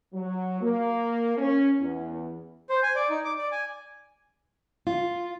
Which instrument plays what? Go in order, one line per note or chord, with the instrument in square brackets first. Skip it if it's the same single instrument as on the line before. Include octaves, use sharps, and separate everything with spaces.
[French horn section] F#3
A#3
C#4
E2
[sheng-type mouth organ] C5
G#5
D5
D#4
D6
D5
G#5
[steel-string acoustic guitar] F4